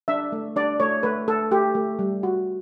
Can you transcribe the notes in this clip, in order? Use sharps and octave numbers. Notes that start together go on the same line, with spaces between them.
D4 E5
A3
D4 D5
A3 C#5
A3 B4
A3 A4
A3 G4
A3
G3
F#4